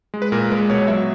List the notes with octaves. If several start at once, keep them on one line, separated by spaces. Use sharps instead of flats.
G#3
B4
A#2 A#4
G#3 B4
B2 C#5
F#3 E5